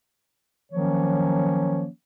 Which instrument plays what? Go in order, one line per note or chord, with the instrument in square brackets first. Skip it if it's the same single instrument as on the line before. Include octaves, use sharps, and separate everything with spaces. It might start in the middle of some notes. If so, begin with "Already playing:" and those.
[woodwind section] D#3 F3 F#3 A#3 C#4 C#5